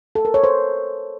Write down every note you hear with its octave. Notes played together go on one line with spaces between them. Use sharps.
A4
A#4
C#5
C5